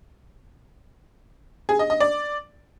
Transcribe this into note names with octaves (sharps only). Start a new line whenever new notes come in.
G#4
D#5
D#5
D5